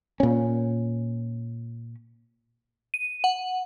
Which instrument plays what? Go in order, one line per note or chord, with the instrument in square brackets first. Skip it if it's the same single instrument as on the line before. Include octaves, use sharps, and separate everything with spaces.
[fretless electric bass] A#2 C#4
[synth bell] D#7
F#5